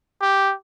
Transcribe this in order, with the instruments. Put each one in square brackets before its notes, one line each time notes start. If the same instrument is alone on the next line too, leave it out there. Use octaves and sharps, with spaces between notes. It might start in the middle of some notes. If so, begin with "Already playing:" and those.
[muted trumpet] G4